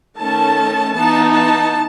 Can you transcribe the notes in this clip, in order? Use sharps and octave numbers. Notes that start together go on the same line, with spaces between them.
D#3 A3 C#4 A5
E3 B3 D#4 A5
A5